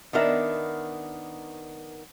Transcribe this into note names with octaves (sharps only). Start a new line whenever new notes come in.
D#3 B3 D4 A#4 E5